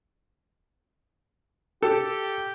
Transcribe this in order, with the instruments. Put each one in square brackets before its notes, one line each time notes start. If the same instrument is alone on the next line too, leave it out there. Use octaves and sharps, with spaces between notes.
[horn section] G4 [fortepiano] A4